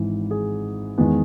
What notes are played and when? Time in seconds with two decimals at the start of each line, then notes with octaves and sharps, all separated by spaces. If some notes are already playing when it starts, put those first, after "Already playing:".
Already playing: G#1 G#2 E3
0.31 G#4
0.98 E2 D#3 G#3 B3